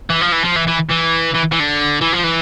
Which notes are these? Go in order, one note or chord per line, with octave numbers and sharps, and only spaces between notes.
E3
F3
E3
F3
E3
E3
E3
E3
E3
D3
E3
F3
E3